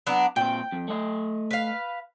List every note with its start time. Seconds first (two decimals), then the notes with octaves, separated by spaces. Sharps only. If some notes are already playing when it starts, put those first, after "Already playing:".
0.07 F#3 B3 D4
0.36 A#2 C4 G5
0.72 F2
0.88 A3 D#5
1.51 B4 F5